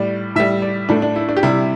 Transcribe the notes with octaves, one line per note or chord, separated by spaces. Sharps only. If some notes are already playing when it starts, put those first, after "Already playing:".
Already playing: A2 G3 D5
A2 G3 E5
D5
A2 A3 D4
D4
E4
D4
G4
C3 G3 E4